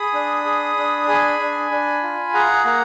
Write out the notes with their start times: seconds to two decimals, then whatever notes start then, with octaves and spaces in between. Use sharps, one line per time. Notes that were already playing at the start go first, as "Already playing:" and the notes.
Already playing: G#4 B5 D#6
0.13 D4
0.45 G#4
0.77 D4
1.08 G#4 G#5 B5
1.40 D4
1.71 D4
2.03 F4
2.34 G#4 F#5 A#5
2.65 A#3 F#5 A#5